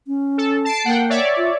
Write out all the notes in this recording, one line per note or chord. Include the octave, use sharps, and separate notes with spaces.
C#4
A4
A5 C7 D7
A#3 F#5 G5
C#5 D5 E5
F4